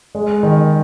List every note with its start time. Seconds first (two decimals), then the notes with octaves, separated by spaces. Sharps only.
0.15 G#3
0.43 D#3